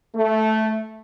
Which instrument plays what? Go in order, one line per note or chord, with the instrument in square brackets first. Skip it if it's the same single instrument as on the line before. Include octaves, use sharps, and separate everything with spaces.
[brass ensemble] A3